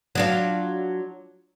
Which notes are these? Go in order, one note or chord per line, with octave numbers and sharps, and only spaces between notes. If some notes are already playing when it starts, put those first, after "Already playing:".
F#3 D4 F4